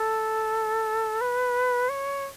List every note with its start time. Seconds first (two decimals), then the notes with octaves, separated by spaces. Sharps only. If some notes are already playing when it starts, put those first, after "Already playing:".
Already playing: A4
1.21 B4
1.89 C#5